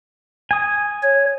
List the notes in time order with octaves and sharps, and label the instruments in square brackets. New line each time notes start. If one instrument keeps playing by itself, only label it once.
[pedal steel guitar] G#5 D#6
[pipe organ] C#5